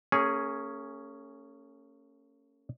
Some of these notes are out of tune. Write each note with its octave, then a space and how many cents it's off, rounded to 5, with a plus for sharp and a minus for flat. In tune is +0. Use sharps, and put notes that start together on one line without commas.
A#3 -40 C#4 +0 G#4 +0